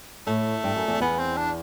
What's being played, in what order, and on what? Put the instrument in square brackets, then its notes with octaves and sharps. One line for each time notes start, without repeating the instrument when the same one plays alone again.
[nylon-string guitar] A2 [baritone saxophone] A3
[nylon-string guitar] G2
F#2
E2
[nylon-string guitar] E2 [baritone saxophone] B3
[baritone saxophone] C4
D4